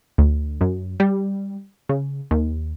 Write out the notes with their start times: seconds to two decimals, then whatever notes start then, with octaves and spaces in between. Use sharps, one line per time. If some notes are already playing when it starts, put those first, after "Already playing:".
0.18 D2
0.61 F#2
1.00 G3
1.89 C#3
2.31 D#2